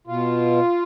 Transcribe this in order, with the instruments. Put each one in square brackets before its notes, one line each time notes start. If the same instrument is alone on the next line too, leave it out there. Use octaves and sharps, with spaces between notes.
[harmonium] B2 F4